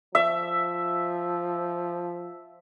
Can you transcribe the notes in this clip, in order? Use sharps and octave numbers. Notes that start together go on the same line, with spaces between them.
F3 E5